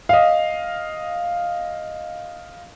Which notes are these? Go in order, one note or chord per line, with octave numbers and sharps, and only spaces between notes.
D#5 F5